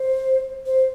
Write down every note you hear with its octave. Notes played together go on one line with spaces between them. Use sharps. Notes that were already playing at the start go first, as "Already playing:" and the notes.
Already playing: C5
C5